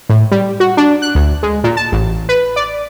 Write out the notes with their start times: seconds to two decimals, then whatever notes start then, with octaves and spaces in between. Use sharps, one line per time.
0.09 A2
0.31 G3
0.60 F#4
0.77 D4
1.02 F#6
1.15 D2
1.43 G#3
1.64 A#2
1.77 A5
1.92 A1
2.29 B4
2.56 D5